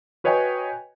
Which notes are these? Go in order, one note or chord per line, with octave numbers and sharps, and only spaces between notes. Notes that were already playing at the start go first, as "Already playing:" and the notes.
F#4 B4 C#5 D#5 G5 G#5